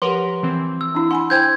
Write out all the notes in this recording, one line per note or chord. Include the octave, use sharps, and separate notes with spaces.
F3 G4 A#4 B4 F#5 C6
E3 C4
E6
D4 E4
F#5 G#5 B5 C6
E4 C5 G5 G6 G#6